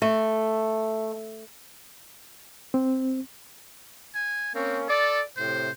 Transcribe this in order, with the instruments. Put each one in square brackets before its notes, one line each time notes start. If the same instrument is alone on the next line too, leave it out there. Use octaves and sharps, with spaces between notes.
[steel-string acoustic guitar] A3 [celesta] E5
[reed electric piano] C4
[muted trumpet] G#5
[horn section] A#3 C#4 [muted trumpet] C4
[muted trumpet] A4 [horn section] D5
[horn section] A2 C3 [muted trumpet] C5